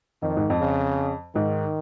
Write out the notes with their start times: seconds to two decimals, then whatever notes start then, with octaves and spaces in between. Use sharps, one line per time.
0.22 F2 D#3
0.37 G#2
0.50 F2
0.61 C#3
1.35 G#2 D#3